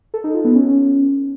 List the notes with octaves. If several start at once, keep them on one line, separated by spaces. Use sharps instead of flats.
A4
D#4
F4
B3
C#4